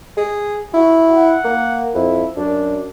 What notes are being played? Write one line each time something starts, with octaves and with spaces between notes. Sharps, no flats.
G#4
E4 F#4
F#5
A#3
F2 E4
F#2 D4